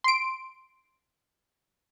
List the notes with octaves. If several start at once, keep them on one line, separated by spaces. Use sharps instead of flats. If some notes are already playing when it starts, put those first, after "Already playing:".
C6 D7